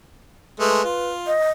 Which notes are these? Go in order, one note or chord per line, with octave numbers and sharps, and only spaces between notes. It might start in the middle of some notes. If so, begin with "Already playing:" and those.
G#3 A3 B4
F4
D#5